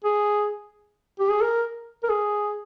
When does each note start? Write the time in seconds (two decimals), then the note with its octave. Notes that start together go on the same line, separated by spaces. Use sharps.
0.05 G#4
1.20 G4
1.30 G#4
1.41 A#4
2.03 A#4
2.10 G#4